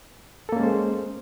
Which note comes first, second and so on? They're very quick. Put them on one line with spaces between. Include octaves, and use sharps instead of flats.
A4 A#3 C#4 G#3 C5